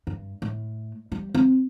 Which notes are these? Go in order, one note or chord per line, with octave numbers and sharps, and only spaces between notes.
G2
A2
G3
C4